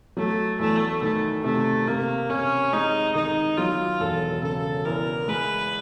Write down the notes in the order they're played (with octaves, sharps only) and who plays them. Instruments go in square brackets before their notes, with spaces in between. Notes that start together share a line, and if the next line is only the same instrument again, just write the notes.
[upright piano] F#3 [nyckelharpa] A3
[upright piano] E2 [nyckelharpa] A3
[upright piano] D#3 [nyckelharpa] A3
[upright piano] C3 [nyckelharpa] A3
[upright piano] C3 [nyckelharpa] A#3
[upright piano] C3 [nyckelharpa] C#4
[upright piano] G#3 [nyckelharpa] D#4
[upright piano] D#3 [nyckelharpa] D#4
[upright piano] F#3 [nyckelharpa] F4
[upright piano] E1 [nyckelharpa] A4
[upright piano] C#3 [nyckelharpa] A4
[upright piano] E2 [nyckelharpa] A#4
[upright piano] G#3 [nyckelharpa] B4